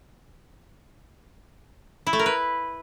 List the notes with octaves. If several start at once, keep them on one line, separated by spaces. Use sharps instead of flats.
E4
A3
A#4
B4